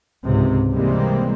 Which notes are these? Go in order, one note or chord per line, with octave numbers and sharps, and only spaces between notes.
C#2 G#2 C3
C3 E3 G3 G#3 A#3 C4